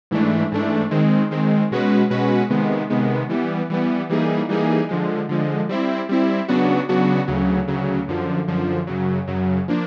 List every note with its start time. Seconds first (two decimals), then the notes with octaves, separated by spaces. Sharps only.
0.11 G#2 E3 A3 D4
0.52 G#2 E3 A3 D4
0.91 D#3 G#3 C4
1.31 D#3 G#3 C4
1.71 B2 G#3 C#4 F#4 B4
2.10 B2 G#3 C#4 F#4 B4
2.50 C3 D#3 G#3 B3
2.90 C3 D#3 G#3 B3
3.29 E3 G3 B3
3.70 E3 G3 B3
4.09 E3 G3 A#3 D#4 G#4
4.49 E3 G3 A#3 D#4 G#4
4.89 D3 F3 G#3
5.29 D3 F3 G#3
5.69 G3 C4 E4
6.09 G3 C4 E4
6.48 C#3 F#3 B3 D4 F#4
6.89 C#3 F#3 B3 D4 F#4
7.28 D2 C#3 F#3
7.68 D2 C#3 F#3
8.08 F#2 D3 F3
8.47 F#2 D3 F3
8.87 F#2 C#3 F#3
9.27 F#2 C#3 F#3
9.68 F3 A#3 D4